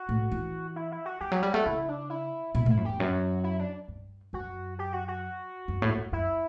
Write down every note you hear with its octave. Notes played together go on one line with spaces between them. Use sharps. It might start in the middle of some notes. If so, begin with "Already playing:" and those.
Already playing: F#4
A2
E3
E4
E4
F#4
E3 G4
F#3 G4
G3
A3 F#4
C#3 E4
D4
E4
B2 E4
A2 E4
F#2
E2 G4
F#2 F#4
E4
D4
G2
F#2 F#4
G4
F#4
F#4
F#2
A2
F#2
F#2 E4